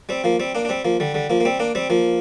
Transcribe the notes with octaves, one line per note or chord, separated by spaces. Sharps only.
G3 C4
F3 A#3
G3 C4
A#3 D4
D4
G3 C4
F3 A#3
D3 G3
D3 G3
F3 A#3
A#3
G3 C4
A#3 D4
G3 C4
F3 A#3